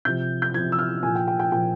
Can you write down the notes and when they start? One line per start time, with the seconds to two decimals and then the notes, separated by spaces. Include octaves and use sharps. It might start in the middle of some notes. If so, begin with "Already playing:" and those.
0.05 C3 F3 G6
0.42 G6
0.54 C3 F3 G#6
0.72 E6
0.79 F6
1.03 A#2 F3 G#5
1.15 G5
1.28 G5
1.39 G5
1.52 A#2 F3 G5